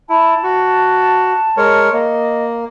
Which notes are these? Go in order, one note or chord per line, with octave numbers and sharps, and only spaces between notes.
E4 A5
F#4
G#3 A#4 C#5
A#3 D#5